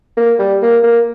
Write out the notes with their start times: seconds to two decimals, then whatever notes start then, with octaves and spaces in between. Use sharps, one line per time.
0.17 A#3
0.39 G3
0.62 A#3
0.83 A#3